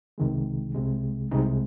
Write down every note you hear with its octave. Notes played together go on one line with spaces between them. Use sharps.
C2 C3 D#3 G#3
C2 C3 G#3
C2 C3 G#3 D#4